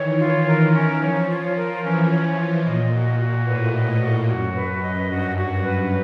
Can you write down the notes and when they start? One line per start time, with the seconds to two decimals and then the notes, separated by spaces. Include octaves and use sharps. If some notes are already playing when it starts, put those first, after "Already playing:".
Already playing: D#3 E3 C#5
0.20 E3 F4
0.47 A#4
0.74 C#4
1.02 F3 C#5
1.29 F4
1.56 A#4
1.83 E3 C#4
2.11 C#5
2.38 F4
2.65 A#2 D#5
2.93 F#4
3.19 F#4
3.46 A2 B4
3.74 D#5
4.01 F#4
4.28 F#2 F#4
4.55 B4
4.83 D#5
5.10 G2 F#4
5.37 F#4
5.64 B4